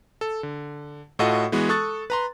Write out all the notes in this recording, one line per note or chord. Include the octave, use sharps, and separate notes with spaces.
A4
D3
A2 F4 F#4 A4 D#5 F#5
E3 G#3 B3 F#4
A4 C#6 D#6 F#6 A6
B4 A#5 C6